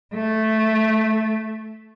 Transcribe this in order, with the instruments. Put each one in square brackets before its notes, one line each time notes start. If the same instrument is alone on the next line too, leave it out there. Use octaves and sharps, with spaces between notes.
[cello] A3